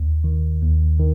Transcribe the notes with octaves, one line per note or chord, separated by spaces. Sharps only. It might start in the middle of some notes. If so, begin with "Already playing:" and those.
Already playing: D#2
D#3
D#2
D#3